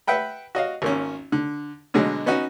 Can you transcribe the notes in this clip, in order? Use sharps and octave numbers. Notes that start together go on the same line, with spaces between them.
B4 E5 F#5 G5 B5
F#4 D#5 F5
G#1 A#3 C#4
D3
B2 D3 F#3 G#3
B3 C#4 D#4 F#4